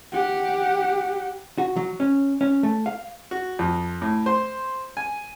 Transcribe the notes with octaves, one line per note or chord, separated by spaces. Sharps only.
G4 F#5
F#4
F#3
C#4
C#4
A3
F5
F#4
F2
A2
C5
G#5